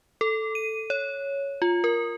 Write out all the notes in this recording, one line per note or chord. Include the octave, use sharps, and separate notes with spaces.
A4
D#7
C#5
F4
A#4